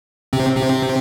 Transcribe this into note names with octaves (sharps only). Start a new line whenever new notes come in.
C3 C4
C3 C4